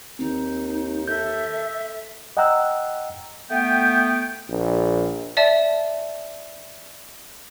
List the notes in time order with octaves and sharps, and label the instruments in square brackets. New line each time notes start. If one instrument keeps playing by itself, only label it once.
[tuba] D#2 [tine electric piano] C4 [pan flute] D#4
[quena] A4 [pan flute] E5 [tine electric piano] G6
[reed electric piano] D#5 F#5 G5 A#5 E6 F#6
[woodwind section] A3 B3 G5
[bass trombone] A#1
[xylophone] D5 E5 A5